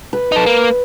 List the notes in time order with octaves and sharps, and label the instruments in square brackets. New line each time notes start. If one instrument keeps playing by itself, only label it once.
[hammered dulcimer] B4
[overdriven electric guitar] D#4 A4
A#3